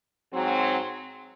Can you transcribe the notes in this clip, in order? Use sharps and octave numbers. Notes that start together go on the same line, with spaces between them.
G#2 F#3 C4